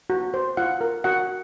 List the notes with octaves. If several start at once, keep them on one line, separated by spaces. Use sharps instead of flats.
F#4
C5
F4 F#5
A#4
F#4 F#5